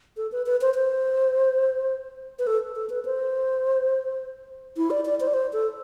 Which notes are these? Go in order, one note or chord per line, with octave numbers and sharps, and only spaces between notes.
A4
B4
B4
C5
C5
B4
A4
A4
B4
C5
E4
D5
D5
C5
D5
C5
A4